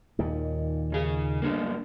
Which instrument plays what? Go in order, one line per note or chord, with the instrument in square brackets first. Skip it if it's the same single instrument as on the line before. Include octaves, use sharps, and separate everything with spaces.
[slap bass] D#2 A#2 D#3
[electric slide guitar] C#3 G#4
G2 D3 A#3